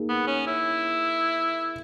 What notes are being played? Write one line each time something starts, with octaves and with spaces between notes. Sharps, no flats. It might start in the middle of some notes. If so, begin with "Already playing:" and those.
Already playing: A#3 D#4 G#4
B3
C#4
E4